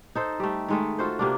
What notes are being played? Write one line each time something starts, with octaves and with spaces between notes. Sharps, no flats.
D#4 A4 C5
G3 A3
D#3 G#3 A3
F4 F#4 A4 C5
C3 A#3 D4